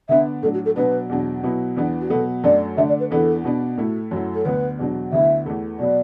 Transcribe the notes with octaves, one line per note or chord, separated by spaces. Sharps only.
D3 B3 D4 E5
A2 F#3 D4 A4
F#4
A4
B2 F#3 B3 D4 B4
E2 B2 F#3 D4
B2 F#3 B3 E4
E2 E3 B3 D4
F#4
B2 F#3 B3 A4
F#2 F#3 A3 D4 D5
D3 A3 D4 E5
D5
B4
E2 E3 B3 D4 A4
B2 B3 D4
A2 A3 E4 F#4
F#2 F#3 A3 E4
A4
D2 D3 B3 B4
E2 B2 F#3 D4
D2 D3 B3 E4 E5
E2 E3 A3 E4
B2 F#3 B3 D5